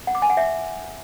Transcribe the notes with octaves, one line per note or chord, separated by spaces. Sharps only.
F#5
D6
G#5
F#5
E5